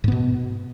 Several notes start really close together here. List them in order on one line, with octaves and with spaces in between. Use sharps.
G#2 B3 B2